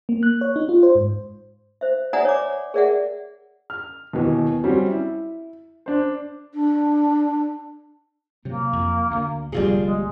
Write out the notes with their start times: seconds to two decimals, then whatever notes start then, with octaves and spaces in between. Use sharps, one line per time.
0.09 A#3
0.23 F#6
0.41 C#5
0.56 D#4
0.69 F4
0.83 C5
0.95 G#2
1.81 C5 E5
2.13 D5 E5 F#5 G#5 A#5 D#6
2.25 C#5 D6
2.74 G#4 A#4 D5 E5 F#5
3.70 F6
4.13 D#2 B2 E3
4.64 F#3 G3 C4 C#4 F#4
4.88 E4
5.86 D4 C5
6.54 D4
8.45 C3 F#3 A#3
8.73 F2
9.11 D2 D3
9.52 D1 A#1 C3 G3 F4 G#4
9.84 G#3